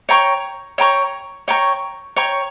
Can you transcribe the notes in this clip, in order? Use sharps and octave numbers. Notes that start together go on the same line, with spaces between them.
C#5 G5 A#5 C#6
C#5 G5 A#5 C#6
C#5 G5 A#5 C#6
C#5 G5 A#5 C#6